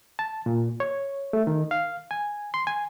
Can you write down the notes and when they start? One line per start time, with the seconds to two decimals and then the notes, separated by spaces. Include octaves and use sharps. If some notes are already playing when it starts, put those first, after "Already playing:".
0.19 A5
0.46 A#2
0.80 C#5
1.33 A3
1.47 D#3
1.71 F5
2.11 G#5
2.54 C6
2.67 G#5